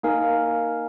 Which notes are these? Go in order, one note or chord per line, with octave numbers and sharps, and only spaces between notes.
A#3 D#4 A#4 F5 G#5